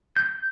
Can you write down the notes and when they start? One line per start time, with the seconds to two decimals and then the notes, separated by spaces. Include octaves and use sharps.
0.17 G6